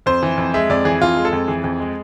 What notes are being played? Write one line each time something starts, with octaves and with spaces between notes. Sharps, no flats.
F2 C5
E3
F2
G#3 E5
F2 D5
E3 G#4
F2 F4
G#3
A4
F2
E3 G#4
F2
G#3